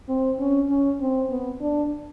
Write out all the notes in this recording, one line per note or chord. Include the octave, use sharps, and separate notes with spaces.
C4
C#4
C#4
C4
B3
D4